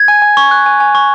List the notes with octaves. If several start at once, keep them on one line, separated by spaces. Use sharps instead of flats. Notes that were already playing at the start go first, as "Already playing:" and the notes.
Already playing: G#6
G#5
G#5
C#6
F#6
G#5
G#5
C#6